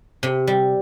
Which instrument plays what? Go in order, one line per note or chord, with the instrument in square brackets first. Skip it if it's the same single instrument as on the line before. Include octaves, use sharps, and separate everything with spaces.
[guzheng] C3
G3